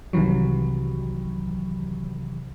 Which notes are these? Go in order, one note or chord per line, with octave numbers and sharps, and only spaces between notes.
C2 C3 D#3 E3 F#3